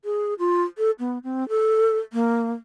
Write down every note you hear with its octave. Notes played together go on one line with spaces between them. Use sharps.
G#4
F4
A4
B3
C4
A4
A#3